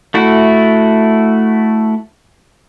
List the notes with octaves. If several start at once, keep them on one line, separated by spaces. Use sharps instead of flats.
A3 E4 F#4